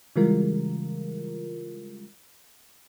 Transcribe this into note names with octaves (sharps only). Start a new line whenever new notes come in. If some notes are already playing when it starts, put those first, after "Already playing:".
C#3 E3 G3 G#3 F4 A#4